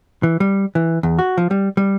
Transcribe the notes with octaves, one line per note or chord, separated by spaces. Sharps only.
E3
G3
E3
E2
F#4
F3
G3
G3